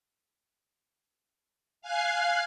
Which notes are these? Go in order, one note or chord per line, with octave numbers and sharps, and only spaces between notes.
F5 G#5 F#6 C7